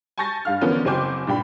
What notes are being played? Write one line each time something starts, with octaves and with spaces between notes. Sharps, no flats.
G#5 A5 C#6 G6 A6 A#6
G2 F5 F6
D3 E3 F3 B3 C#4 A#4
F#1 F#3 C4 G#5 D6 G6
G2 A#2 G5 B5